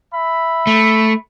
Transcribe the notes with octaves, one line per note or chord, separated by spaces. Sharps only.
E5 B5
A3